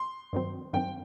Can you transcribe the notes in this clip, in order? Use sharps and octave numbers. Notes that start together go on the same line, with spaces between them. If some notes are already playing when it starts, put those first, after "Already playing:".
Already playing: C6
G2 D#3 F#3 C4
G2 D#3 F#3 C4 G5